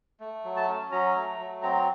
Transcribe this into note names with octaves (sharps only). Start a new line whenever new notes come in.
A3
F#3
A5
C#4
F#3 A#5
A3
F#3
C4 A#5